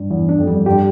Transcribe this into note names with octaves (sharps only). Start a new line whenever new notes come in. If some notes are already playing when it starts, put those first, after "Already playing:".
Already playing: G2
E2 E3
D4
F2
G3
G2 G4